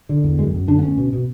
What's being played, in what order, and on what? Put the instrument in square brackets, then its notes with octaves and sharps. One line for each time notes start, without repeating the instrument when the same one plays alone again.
[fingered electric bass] D3
E2
F#2 G#3
F#2
D3 D4
B3
D2 C#4
B2
B2